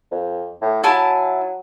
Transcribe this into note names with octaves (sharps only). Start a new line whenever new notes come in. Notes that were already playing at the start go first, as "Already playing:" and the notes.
F2
A2
F#3 E4 G#5 A5